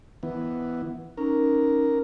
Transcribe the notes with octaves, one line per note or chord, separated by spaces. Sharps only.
E3 B3
C#4 D#4 A#4